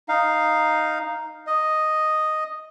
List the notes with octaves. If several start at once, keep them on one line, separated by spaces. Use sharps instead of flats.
D#4 F5
D#5